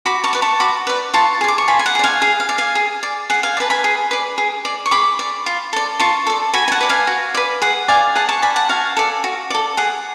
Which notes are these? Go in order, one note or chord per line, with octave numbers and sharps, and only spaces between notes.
F#4 B5 D6
A5 C#6
B4 D5
A5 C#6
F#4 B5 D6
B4 D5
F4 A5 C#6
G#4 D5
D6
C#6
F4 G#5 B5
G#5
F#5 A5
G#4 D5
F5 G#5
G#4 F5
F5
D5
F5 G#5
G#4
D5
G#4 F#5
F5 G#5
D5
B4 A5
G#5 B5
G#4
B4 D5
G#4
D5
C#6
G#4 B5 D6
D5
F4
A4 D5
F4 A5 C#6
A4 D5
F#4 G#5 B5
G#5
F#5 A5
B4 D5
F5 G#5
F#4
B4 D5
G#4 F#5
D5 F5 G#5
G#4 F#5 A5
A5 C#6
D5 G#5 B5
F#5 A5
F#4 F5 G#5
A4 D5
F#4
A4 D5
G#4 F#5